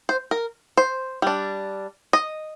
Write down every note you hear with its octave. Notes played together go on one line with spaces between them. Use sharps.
C5
A#4
C5
G3 D4
D#5